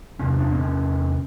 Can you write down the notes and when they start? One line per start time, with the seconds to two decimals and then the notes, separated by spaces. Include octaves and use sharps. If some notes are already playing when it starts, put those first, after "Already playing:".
0.20 E2 C3 C#4
0.39 D4
0.52 C4
0.58 C#4